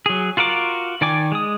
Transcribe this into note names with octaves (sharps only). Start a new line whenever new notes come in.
F#3 G#4
F4 F#4 A#4 D5 D6
D#3 D5 G5 G#5 D6
G#3 D#6